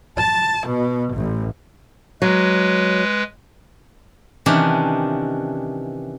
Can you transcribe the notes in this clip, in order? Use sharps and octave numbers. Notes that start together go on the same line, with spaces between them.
A5
B2
A1
F#3 G#3 B4
C3 D#3 E3 C#4 D4